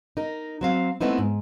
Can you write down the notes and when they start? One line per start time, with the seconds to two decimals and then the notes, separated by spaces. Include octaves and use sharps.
0.17 D#4 A#4
0.61 F#3 C4 F5
1.01 A3 B3 C4 D#4 E4
1.18 G#2